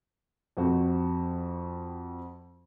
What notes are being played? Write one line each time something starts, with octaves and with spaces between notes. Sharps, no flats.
F2 C4 F#4